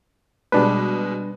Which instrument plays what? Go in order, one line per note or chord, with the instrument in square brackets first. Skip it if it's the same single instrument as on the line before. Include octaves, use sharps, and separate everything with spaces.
[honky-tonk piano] B2 G#3 [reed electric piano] G3 D4 B4